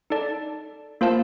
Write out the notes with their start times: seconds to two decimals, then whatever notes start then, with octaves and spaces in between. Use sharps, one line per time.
0.10 D#4 A4 D5 A5
1.01 A#3 F4 C5 F5 A5